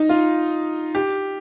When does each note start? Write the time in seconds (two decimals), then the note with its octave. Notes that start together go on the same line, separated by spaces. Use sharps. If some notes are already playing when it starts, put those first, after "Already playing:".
Already playing: D#4
0.09 F4
0.95 G4